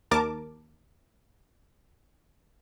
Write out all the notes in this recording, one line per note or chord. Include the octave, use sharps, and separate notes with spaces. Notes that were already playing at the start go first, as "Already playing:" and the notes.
D#2 A#4 A5 D6